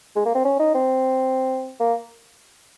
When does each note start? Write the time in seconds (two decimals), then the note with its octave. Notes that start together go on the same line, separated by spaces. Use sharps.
0.16 G#3
0.26 A#3
0.35 C4
0.45 C#4
0.60 D#4
0.75 C4
1.80 A#3